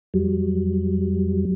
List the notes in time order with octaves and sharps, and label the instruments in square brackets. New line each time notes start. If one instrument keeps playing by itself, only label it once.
[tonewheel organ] F2 F#3 G3